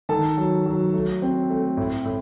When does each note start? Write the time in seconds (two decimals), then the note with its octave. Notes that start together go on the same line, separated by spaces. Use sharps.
0.09 D#3 A4 A5
0.37 F#3
0.66 F#3
0.94 A3
1.22 C4
1.50 A3
1.77 A2
2.05 A2